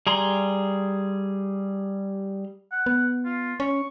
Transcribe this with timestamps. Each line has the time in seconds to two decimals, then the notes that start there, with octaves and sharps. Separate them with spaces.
0.07 G3 G#4 A#5 C6
2.72 F#5
2.86 B3
3.25 F4
3.60 C#4 C#6